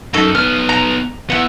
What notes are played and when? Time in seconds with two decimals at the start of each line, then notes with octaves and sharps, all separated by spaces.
0.14 F#2 C#4 D#4 A4
0.35 B3 D#4 F6
0.69 A#5
1.30 B3 E4 E5 F#5